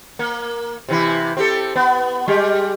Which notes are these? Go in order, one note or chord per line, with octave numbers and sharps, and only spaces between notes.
A#3
C3 E3 E4
C4 G4 A4
B3
G3 G#3 G4